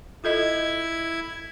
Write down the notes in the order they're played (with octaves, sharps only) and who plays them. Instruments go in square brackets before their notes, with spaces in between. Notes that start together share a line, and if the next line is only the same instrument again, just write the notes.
[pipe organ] E4 G#6 [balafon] F4 A4 D#5